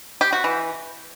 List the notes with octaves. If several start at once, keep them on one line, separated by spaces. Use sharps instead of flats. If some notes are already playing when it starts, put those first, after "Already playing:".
G4
F#4
E3